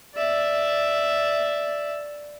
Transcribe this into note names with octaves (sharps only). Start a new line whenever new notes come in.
D5 E5